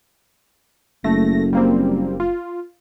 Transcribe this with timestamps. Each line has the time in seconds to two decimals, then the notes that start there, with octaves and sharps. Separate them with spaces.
1.04 F#1 A3 A#6
1.53 G3 A#3 C4
2.20 F4